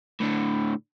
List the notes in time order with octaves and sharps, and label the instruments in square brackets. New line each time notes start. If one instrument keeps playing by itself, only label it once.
[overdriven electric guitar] A2 D3